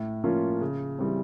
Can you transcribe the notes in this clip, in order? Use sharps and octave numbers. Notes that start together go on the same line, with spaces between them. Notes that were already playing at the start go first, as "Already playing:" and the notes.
Already playing: A2
F3 A#3 C#4 F4
C#3
E3 G3 C4